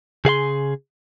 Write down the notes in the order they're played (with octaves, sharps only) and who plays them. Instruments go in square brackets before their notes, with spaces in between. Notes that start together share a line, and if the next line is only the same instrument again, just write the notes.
[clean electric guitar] C#3 G#4 F5 C6